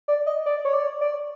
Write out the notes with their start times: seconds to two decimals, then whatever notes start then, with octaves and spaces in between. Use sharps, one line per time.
0.08 D5
0.26 D#5
0.46 D5
0.65 C#5
0.73 D5
1.01 D5